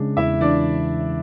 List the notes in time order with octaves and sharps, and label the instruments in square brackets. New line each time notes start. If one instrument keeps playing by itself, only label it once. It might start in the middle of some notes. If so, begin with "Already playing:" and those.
Already playing: [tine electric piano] C#3 G#3 [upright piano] D4
[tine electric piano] E2 [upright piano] E4 E5
[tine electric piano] E3 [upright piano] D4 D5